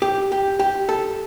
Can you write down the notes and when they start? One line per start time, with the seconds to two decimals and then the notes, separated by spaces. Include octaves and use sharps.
0.02 G4
0.32 G4
0.59 G4
0.89 A4